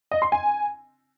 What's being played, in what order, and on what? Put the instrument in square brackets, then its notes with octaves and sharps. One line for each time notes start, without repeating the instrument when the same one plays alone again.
[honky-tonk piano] D#5
C6
G#5